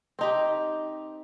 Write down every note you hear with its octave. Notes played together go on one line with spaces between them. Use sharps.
C4 D#4 G4